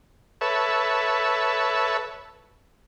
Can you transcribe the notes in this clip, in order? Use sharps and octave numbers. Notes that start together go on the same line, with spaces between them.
A4 B4 C#5 E5